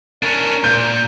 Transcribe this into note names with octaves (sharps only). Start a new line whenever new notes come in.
C#4 D4 A#4
A#2 G6